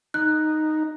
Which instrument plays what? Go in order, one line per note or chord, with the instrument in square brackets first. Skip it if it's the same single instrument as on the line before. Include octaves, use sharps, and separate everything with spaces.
[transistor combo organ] D#4 [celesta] F#6